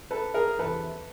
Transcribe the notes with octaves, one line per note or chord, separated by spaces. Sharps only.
A4 B4
G#4 A#4
E2 C3 E3 A4 B4